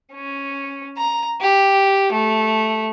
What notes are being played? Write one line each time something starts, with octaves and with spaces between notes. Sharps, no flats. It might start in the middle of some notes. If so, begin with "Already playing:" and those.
C#4
A#5
G4
A3